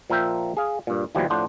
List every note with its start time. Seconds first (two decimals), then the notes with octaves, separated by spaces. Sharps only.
0.10 A#2 F3 A#4 E5 G5
0.57 G#4 F5
0.87 G2 A#2
1.15 D#2 B2 E3 F3 G3
1.30 A2 F3 D4 C5 F#5